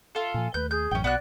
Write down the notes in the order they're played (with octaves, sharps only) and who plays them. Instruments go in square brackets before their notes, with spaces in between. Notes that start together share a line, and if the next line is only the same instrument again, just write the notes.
[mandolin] F4 A4
[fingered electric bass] A#2 F3 [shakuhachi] G#5
[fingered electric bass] D#2 A3 [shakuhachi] B4 [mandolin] G6
[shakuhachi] G#4 [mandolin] G6
[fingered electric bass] A1 F#2 [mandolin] C#4 G5
[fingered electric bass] B1 [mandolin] B3 F#4 F#6 [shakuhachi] D5